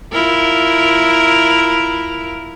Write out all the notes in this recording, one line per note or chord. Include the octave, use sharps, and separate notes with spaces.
E4 F4 A#4